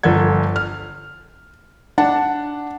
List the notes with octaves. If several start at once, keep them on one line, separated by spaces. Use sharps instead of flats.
G1 F3 A4 F#5 G#6
F6
D4 F#5 A5